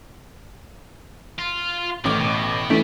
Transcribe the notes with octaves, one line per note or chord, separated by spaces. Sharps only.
F4
A1 A2 D#3 D6
B2
E3 A3 G4 D5